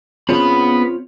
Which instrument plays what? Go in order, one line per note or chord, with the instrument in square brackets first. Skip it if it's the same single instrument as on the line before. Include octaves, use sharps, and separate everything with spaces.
[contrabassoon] C#3 [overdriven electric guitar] B3 B5 [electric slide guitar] C4 F4 C#5